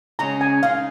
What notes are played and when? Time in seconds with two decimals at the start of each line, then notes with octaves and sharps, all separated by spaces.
0.19 C#3 G#3 C#4 G#4 A#5
0.41 G#5
0.63 C#3 G#3 D#4 G#4 F5